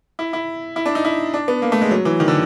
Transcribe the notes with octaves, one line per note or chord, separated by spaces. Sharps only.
E4
E4
E4
D4
D#4
E4
D4
B3
A#3
A3
G#3
F#3
E3
D#3
D3